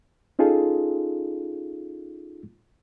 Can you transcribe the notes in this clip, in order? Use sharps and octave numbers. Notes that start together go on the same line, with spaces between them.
C#4 D#4 F4 G#4 A4